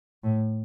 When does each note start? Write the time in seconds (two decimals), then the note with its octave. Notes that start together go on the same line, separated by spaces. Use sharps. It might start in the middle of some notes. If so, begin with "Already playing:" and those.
0.24 A2